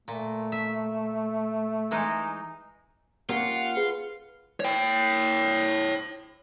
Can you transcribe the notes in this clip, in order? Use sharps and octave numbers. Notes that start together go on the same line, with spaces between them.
A#2 A3
E5
E3 G#3 D#4
A#3 C#4 F4 G4 F#5
G#4 B4
C#5 G5